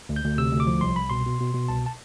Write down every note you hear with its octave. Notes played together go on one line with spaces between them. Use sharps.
D2
G6
D2
C3 E6
D2
D6
F3
C2 C6
C2 B5
B2 C6
B2
B2
B2
C2 A5
A5